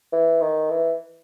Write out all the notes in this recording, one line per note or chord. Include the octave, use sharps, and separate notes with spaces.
E3
D#3
E3